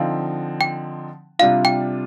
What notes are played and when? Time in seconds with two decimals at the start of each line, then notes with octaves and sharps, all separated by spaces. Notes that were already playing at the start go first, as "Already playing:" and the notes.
Already playing: D3 F3 C4 D#4 F5
0.61 G5
1.39 C3 G3 D4 F4 F5
1.65 G5